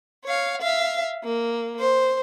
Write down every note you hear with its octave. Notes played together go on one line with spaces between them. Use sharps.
C#5 F5
E5 F5
A#3
C5